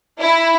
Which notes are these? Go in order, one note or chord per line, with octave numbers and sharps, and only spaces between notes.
E4